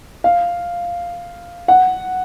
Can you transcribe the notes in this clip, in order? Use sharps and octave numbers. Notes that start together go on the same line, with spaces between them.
F5
F#5